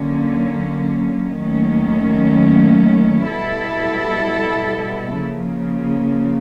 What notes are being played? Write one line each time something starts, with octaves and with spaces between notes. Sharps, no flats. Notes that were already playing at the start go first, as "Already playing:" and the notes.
Already playing: D3 F#3 A#3 C#4
D#2 D#3 F#3 A3 C#4
B2 G3 B3 E4 A4
C#3 F3 A#3